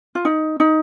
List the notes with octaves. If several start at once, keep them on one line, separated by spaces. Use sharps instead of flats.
F4
D#4
D#4